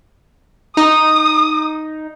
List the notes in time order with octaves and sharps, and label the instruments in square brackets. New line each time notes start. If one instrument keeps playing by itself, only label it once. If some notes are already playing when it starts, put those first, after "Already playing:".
[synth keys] D#4 [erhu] D#6